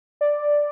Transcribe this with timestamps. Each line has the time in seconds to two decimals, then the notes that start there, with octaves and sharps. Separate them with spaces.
0.21 D5